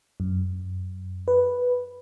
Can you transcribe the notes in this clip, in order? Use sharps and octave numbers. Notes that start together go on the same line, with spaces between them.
F#2
B4